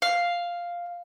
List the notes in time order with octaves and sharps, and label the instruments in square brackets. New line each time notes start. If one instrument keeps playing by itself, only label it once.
[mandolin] F5